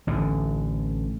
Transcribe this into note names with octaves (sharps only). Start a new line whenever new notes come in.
A1 A2 D3